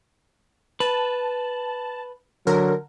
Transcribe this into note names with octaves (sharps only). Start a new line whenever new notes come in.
B4 A5
D3 F#3 A#4